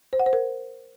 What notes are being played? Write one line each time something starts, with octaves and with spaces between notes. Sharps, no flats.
C5
F#5
C5
A#4